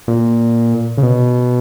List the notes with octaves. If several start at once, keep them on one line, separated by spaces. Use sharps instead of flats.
A#2
C#3
B2